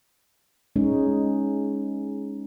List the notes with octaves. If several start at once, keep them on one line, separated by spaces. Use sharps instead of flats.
G#3 C#4 D#4